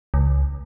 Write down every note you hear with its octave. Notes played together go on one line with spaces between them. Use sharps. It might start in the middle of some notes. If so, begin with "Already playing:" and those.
C#2